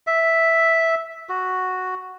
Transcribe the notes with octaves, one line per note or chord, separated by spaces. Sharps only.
E5
F#4